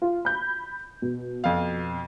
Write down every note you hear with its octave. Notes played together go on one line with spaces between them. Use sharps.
F4
B5 G6
B2
F2 F5